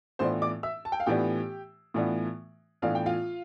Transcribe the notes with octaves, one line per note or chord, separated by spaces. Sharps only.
A2 E3 B3 D4 F4 C5 C6
D5 D6
E5 E6
A5
G5
F5
A2 E3 B3 D4 F4 G4 G5
A2 E3 B3 D4 F4
A2 E3 B3 D4 F4 F5
G5
F4 F5